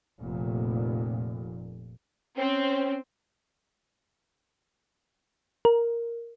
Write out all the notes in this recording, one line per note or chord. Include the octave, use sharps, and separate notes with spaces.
F1 A#2
C4 C#4
A#4